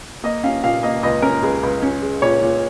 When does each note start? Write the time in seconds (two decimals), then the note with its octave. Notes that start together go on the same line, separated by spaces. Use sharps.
0.24 A#3 D#5
0.43 C#4 F5
0.64 A#2 F5
0.83 A#3 D#5
1.03 C#2 D#5
1.22 C#4 A#4
1.43 C#2 G#4
1.63 C#2
1.83 C#4
2.02 G#3
2.22 A#2 C#5
2.42 A#2